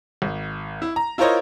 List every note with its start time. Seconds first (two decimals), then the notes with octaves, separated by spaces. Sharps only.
0.22 G#1
0.82 E4
0.96 A#5
1.18 E4 F4 A#4 C5 C#5 D#5